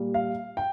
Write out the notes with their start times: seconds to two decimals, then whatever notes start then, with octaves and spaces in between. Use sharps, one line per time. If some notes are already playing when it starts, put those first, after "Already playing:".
Already playing: A#2 G3 A#3
0.14 F5
0.57 G5